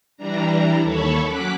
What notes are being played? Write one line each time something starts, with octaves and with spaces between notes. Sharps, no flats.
E3 G3 D4 A#5
D#2 A4 C#5 A5 B5 C#6
F#3 C#4 D6 F#6 B6